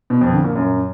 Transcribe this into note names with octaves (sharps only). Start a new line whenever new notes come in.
B2
F2
D3
A#2
F#2